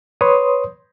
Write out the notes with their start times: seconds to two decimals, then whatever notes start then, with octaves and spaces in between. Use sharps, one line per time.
0.21 B4 C#5 C6 D#6